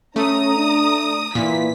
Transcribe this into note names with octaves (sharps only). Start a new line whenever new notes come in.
A3 C#4 A#5 D#6
D4
A#2 E3 E4 B6